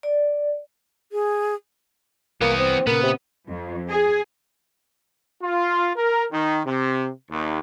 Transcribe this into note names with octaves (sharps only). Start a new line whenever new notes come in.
D5
G#4
C2 E3 A#3 B3
C4
A#2 C#3 B3 A#4
C3
F2
G#4
F4
A#4
D#3
C3
D#2